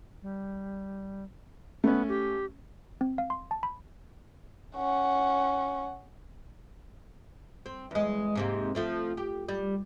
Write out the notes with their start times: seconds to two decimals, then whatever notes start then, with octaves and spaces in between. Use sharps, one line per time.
0.22 G3
1.84 A3 B3 C#4
2.08 G4
3.01 C4
3.18 F5
3.30 C6
3.51 A5
3.63 B5
4.76 C#4 F#5
7.66 C4
7.91 E2 G#3
8.35 G#2 C3 A#3
8.75 F3 A3 C4
9.17 G4
9.49 G3